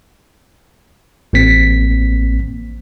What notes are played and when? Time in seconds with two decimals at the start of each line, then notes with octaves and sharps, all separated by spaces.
1.33 A1 A#3 C4 B6